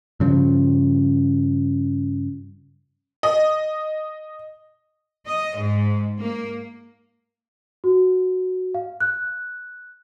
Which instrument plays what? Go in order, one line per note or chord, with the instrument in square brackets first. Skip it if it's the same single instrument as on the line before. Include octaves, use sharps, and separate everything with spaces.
[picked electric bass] G2 C#3 F3
[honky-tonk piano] D#5
[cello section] D#5
G#2
A#3
[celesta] F#4
F5
F#6